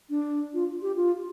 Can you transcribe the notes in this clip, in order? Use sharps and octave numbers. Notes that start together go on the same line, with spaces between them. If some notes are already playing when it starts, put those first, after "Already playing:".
D4
F4
G4
F4